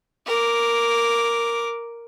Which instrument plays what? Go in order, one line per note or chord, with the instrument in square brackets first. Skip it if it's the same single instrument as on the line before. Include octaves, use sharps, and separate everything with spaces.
[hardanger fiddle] A#4 D6